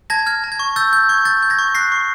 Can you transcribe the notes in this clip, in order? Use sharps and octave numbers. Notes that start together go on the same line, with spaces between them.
A5 G#6 A#6
F6 G#6
A5
G#6
C#6
E6 G6 A6
G6
C#6 G#6
G6 A6
G6
G#6 A#6
C#6
F#6 A#6 C7
C#6